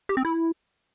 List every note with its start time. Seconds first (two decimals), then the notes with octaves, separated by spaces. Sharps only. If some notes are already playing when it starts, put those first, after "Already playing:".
0.09 G4
0.17 C4
0.25 E4